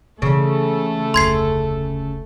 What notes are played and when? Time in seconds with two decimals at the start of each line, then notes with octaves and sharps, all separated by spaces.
0.22 C#3 E3 A3 A4
1.14 F1 D2 C6 G#6 C7